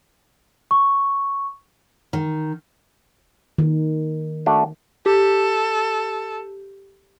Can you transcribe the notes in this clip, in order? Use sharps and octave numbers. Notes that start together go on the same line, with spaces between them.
C#6
D#3
D#3
A3 D4 F#4
G4 A4